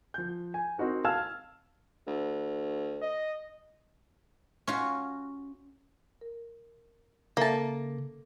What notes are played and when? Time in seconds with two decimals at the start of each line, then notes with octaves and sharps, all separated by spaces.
0.14 F3 G6
0.54 G#5
0.78 C4 D#4 F#4 A#4
1.05 F5 A5 E6 F6 G#6 E7
2.07 D2
3.02 D#5
4.67 C#4 F4 F#4
6.21 A#4
7.37 C#3 A#3 A4 E5 A5